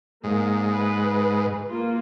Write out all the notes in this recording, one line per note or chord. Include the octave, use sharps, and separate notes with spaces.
G#2 A#3
B4
A#3 F4